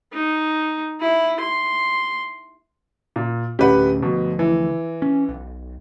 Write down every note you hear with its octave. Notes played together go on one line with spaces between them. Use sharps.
D#4
E4
C6
A#2
D1 D2 C#4 G4 B4 F#5
D2 B2 F3
E3
C#4
B1